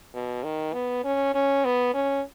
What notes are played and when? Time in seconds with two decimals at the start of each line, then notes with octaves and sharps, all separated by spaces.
0.14 B2
0.43 D#3
0.73 B3
1.04 C#4
1.34 C#4
1.65 B3
1.94 C#4